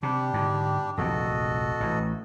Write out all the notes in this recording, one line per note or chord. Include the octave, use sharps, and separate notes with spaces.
C3 G3 D4 G4
G#2 D3
F1 A#1 D#2 F#4 A4 D#5
A1 E3